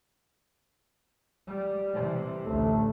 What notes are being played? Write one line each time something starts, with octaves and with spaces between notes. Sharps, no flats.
G3
C3 E3
A1 D2 A3